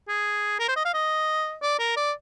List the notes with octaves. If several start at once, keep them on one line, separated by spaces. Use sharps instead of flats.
G#4
A#4
C5
D#5
F5
D#5
D5
A#4
D5